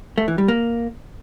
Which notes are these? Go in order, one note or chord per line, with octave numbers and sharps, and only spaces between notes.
A3
E3
G3
A#3